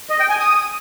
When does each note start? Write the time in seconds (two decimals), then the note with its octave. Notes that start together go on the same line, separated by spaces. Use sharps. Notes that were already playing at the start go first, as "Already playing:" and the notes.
0.10 D#5
0.20 G5
0.29 G#5
0.39 D#6